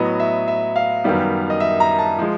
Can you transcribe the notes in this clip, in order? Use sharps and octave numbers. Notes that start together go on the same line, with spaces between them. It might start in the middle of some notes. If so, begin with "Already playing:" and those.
Already playing: A2 F#3 B3 D#5
E5
E5
F5
F#2 D#3 G3 B3
D#5
E5
A#5
A5
F3 G#3